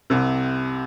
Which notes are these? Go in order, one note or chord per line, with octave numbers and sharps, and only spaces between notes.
C2 C3